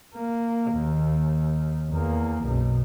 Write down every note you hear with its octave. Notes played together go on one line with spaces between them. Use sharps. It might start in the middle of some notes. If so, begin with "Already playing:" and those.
A#3
D#2
E2 A#3
B1 F#2